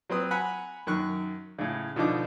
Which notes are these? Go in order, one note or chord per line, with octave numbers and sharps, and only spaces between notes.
F#3 C4 B4 D#6
F#5 G#5 A#5 B5 F#6
F#2 D#3 C#6 F#6
A2 C#3
B2 D3 F3 D#4 D6